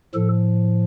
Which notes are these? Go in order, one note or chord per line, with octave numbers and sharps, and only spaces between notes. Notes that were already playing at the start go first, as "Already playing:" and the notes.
A2 F3 A4